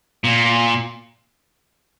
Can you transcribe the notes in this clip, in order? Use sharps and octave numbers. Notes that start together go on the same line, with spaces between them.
A#2